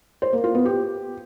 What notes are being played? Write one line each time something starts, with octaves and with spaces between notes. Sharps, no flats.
C5
A#3
F4
B3
G4